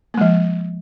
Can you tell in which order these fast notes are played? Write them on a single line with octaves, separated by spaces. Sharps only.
A#3 G#3 F3